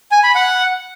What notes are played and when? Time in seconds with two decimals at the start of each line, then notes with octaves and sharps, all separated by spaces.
0.11 G#5
0.23 B5
0.35 F#5